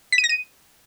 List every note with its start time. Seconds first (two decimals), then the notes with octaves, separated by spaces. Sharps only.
0.12 B6
0.18 D#7
0.24 A#6
0.29 D#7